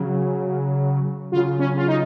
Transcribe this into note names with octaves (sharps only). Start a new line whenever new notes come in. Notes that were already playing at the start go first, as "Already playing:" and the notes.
Already playing: C#3 F#3
C#3 F#3 F4
C#4
F4
D#4